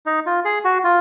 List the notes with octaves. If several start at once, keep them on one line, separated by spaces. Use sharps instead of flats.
D#4
F4
G#4
F#4
F4